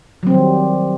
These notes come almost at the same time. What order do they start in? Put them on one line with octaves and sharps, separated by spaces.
F#3 C4 D#3 G3